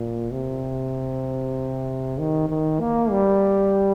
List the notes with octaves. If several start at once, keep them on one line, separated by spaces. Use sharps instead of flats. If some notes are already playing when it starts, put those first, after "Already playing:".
Already playing: A#2
C3
D#3
D#3
A#3
G3